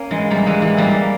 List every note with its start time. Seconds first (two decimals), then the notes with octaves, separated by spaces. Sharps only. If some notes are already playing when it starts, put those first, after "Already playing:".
Already playing: A#3 C#4
0.11 E3 G#3
0.30 G3 A#3
0.46 E3 G#3
0.62 E3
0.77 G3 A#3